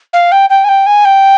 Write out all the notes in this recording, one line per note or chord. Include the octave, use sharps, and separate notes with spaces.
F5
G5
G5
G#5
G5
G#5
G5